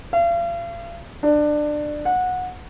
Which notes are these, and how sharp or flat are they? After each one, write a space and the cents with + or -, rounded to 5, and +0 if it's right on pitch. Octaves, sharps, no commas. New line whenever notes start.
F5 -40
D4 +20
F#5 -20